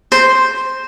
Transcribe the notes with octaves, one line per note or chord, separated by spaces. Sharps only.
C5